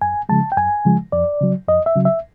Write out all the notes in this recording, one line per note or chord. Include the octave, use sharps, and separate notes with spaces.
F#2 G#5
C#3 F3 G#3 A5
G5
F#2 G#5
C#3 F3 G#3
F2 D5
C#3 F#3
F2 D#5
E5
C#3 F#3
E5